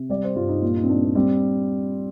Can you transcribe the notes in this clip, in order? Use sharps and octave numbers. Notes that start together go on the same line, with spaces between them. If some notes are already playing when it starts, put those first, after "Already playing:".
Already playing: C3
G3 D5
C5
G2 F4
D#4
A#2 F4
D#4
C4
A#2 D4
C4
G3 C4